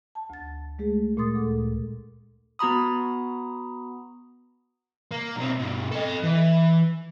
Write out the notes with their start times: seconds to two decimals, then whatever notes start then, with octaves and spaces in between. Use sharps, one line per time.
0.15 A5
0.30 D2 A6
0.79 G#3 A3 G#4
1.17 A#2 A3 C6 D#6 A6
1.35 D2 A4 D6
2.59 B3 F#4 A#5 B5 D#6
5.11 A#3
5.36 B1 C4
5.60 G2 B2
5.92 A4 D#5
6.23 E3